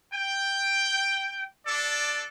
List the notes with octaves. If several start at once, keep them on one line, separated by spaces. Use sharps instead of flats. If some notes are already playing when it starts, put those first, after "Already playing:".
G5
D4 A4 D5